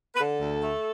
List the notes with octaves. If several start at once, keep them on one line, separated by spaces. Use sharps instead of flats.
B4
D3 A4
D2
A3